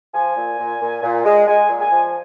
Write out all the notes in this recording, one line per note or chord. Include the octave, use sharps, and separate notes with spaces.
F3 G#5
A#2
A#2
A#2
A#2
G#3
G#3 G#5
A#2
G#5
F3